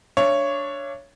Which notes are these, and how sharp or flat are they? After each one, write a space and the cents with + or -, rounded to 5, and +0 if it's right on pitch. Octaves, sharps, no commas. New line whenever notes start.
D4 -5 C#5 +0 E5 +45